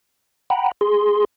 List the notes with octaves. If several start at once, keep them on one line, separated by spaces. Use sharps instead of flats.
F#5 G5 A#5 B5
G#4 C6